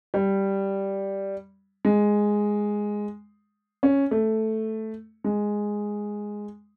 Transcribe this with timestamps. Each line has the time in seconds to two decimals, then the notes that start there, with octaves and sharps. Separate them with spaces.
0.14 G3
1.85 G#3
3.83 C#4
4.11 A3
5.24 G#3